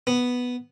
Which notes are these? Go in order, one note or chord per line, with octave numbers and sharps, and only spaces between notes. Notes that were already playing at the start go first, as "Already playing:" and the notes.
B3